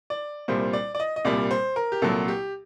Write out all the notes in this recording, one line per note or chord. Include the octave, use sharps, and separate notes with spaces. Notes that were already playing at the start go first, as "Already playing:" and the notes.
D5
C2 A#2 G3 C5
D5
D5
D#5
D#5
C2 A#2 G3 D5
C5
A#4
G4
C2 A#2 F#3 A4
G4